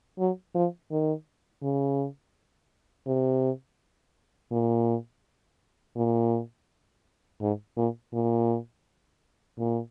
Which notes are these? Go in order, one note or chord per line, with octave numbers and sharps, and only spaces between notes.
F#3
F3
D#3
C#3
C3
A#2
A#2
G#2
A#2
A#2
A#2